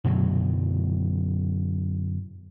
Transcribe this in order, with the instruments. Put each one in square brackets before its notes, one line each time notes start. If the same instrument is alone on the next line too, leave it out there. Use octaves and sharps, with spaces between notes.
[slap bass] F#2 B2 D3 F#3